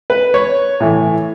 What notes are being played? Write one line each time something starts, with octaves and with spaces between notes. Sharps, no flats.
B4
C#5
A2 E3